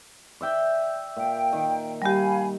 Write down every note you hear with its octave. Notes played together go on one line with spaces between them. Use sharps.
D5 E5 G5
A#2 G5
D#3
G3 G4 F5 G#5 B5